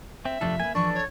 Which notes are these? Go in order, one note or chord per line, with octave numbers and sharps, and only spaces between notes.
C4 E5
F2 C3 A3 D4 F4 A4
A#3 B4 G#5
E3 F3 D4 A4 B4 C#6
C#5